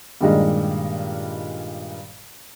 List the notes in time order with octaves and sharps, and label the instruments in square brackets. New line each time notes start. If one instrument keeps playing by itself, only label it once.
[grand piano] G2 A#2 D#3 G3 G#3